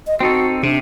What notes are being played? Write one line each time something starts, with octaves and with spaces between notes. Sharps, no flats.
D#5
C4 D#4 F#4 A4
C3 D4